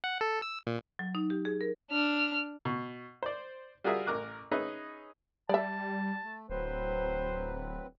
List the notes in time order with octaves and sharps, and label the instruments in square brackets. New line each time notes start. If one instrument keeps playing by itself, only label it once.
[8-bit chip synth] F#5
A4
E6
A#2
[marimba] F#3
D#4
G4
G#4
A#4
[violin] D4 F6
[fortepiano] B2
C5 D5
G3 F4 F#4 G#4 A#4 E5
A1 A#4 D6 F#6
C#4 D#4 G#4 B4 D#5 E5
[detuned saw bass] G3 [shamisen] D5 E5 [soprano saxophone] A5
[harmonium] A3
[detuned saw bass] D1 [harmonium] F#3 C4 B4 [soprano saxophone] C5